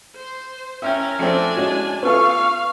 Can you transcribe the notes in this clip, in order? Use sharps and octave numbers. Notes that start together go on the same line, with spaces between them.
C5
C#4 A#4 E5 G5
F2 A3 C4 D4 G#5
G#3 C#4 F#4
B3 F4 A4 F5 C#6